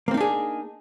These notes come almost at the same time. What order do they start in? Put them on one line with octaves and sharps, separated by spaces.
A#3 C4 D#4 D4 G#4